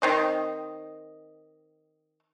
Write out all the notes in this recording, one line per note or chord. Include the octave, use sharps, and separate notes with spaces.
D#3 C4 D#5